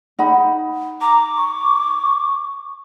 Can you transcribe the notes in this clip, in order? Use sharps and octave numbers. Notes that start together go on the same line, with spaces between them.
D#4 F#5 B5
A#5 D6
C#6